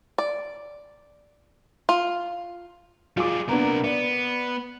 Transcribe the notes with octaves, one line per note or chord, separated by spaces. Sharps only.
D5
F4
G3 F4 G#4 D6
C3 A#3 B3 D4 A#4
B3 D5